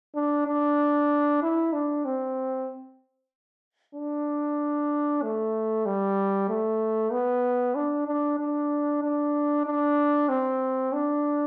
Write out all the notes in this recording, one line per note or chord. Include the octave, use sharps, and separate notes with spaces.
D4
D4
E4
D4
C4
D4
A3
G3
A3
B3
D4
D4
D4
D4
D4
C4
D4